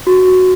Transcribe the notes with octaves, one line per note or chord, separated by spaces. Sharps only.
F#4